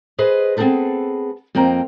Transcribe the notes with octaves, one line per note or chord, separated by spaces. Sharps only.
G#4 B4 C5 D#5
B3 C4 D#4 G#4 A4 B4
F2 A#3 C4 G5 A#5